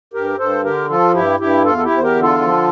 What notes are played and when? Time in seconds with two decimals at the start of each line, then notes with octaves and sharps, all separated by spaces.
0.13 G2 G4 A#4
0.38 G2 A4 C5
0.64 D3 G4 A#4
0.89 F3 F4 A4
1.14 G2 E4 G4
1.40 G2 E4 G4
1.64 E2 F4 A4
1.77 A4
1.84 E4 G4
1.90 E2
1.98 C5
2.03 G4 A#4
2.15 D3
2.21 F4 A4
2.41 F3